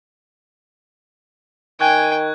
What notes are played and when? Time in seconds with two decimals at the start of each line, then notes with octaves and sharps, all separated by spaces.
1.80 D#3 G5 G#5 C#6 F#6 G#6